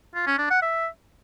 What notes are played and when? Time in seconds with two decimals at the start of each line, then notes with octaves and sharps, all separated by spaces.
0.15 F4
0.27 C#4
0.38 D4
0.50 F#5
0.62 E5